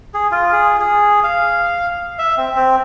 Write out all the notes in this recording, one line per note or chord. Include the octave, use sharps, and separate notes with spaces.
G#4
F4
G#4
G#4
F5
E5
C4
C4